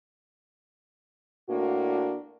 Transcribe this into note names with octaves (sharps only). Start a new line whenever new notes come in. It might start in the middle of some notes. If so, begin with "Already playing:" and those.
A2 A#3 D4 F#4